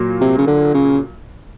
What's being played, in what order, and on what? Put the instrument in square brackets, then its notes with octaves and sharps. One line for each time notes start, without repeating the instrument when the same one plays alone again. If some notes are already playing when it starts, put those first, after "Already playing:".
Already playing: [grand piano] A#2 F#3 A#3
[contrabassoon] C3
C#3
D3
C#3